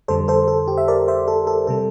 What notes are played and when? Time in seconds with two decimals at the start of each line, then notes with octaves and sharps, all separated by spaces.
0.08 F2 D3 G3 A4 C5
0.28 A4 C5
0.48 A4
0.68 G4
0.78 E5
0.88 A#4 D5
1.08 C5 E5
1.28 A4
1.47 A4
1.67 C3 G3 A4